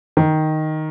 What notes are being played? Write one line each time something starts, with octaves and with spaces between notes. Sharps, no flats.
D#3